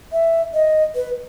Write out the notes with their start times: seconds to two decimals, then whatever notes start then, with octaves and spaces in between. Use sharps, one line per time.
0.13 E5
0.54 D#5
0.95 B4